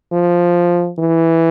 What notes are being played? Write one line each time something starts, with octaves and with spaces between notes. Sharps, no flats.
F3
E3